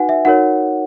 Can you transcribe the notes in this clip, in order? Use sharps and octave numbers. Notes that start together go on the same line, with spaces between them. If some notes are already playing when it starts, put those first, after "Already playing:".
Already playing: D#4 F#4 B4 F#5 G#5
E5
D#4 F#4 A#4 C#5 F#5